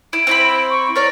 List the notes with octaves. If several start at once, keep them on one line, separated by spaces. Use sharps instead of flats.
E4 D7
C4 E4 B5
C#6
A#4 C#5 D5 A6